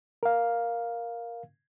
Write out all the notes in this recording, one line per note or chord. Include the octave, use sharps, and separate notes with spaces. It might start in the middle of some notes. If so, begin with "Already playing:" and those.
A#4 F5